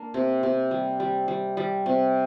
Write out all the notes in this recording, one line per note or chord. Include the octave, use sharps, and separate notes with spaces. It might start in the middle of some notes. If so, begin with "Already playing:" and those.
Already playing: A#3 D4
C3
C3
G3
G3
G3
G3
C3